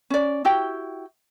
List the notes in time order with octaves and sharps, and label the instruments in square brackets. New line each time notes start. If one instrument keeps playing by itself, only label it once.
[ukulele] C#4 D5
E4 F#4 G4 G5